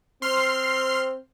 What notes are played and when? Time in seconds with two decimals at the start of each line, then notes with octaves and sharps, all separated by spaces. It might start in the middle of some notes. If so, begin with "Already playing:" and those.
0.22 C4 C6 F6 C7